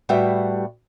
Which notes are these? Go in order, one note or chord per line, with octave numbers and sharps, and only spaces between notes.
A2 G3 F#4 G4 B4 E5